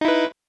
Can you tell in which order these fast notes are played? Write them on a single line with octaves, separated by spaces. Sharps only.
D#4 E4 B4